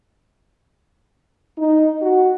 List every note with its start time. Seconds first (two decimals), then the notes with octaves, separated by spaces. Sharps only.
1.59 D#4
2.02 F#4